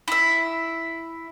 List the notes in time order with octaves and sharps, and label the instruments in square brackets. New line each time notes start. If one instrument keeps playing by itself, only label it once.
[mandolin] E4 E5